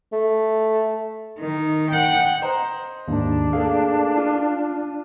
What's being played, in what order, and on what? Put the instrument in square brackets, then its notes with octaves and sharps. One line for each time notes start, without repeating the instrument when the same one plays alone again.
[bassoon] A3
[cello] D#3
F#5 G5
[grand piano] C5 D#5 A#5
[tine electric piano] D#2 G#2 [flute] D4
[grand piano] A3 A#3 G#4 [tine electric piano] F5
[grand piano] F4